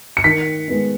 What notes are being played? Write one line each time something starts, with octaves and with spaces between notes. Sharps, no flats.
C#7
D#3 B6
G#3 B3 D#4